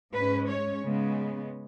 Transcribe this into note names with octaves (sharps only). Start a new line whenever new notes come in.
G#2 G#3 C#4 B4
C#5
C#3 G#3 B3